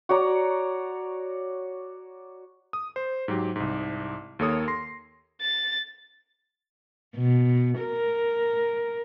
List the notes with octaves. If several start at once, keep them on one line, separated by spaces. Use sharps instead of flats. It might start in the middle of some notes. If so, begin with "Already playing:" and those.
F#4 C#5 D5 A#5
D#6
C5
G#2 F#3 G4
C2 G#2
D#2 A#3 A4 C#5 D#6
C6 A#6 C7
A6
B2
A#4